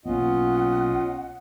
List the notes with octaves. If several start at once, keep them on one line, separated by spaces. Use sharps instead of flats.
B1 A#3 B3 C#4 F4 D#5 F#5